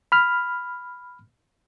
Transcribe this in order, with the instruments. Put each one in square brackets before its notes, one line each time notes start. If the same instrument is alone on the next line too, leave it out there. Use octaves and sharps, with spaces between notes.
[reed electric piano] B5 F6